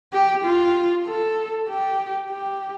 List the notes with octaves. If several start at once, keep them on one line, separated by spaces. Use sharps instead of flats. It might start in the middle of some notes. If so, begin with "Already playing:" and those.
G4
F4
A4
G4
G4